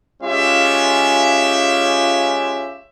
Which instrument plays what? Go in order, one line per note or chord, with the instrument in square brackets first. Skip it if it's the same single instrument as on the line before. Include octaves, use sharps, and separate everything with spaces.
[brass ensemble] G#3 C#4 F4 G4 E5